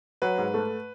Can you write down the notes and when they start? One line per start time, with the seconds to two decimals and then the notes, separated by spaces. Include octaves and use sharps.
0.22 F#3 B4
0.38 G#2
0.54 A3